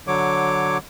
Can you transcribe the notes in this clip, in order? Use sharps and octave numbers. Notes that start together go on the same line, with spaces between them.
D3 F#3 C#5 D6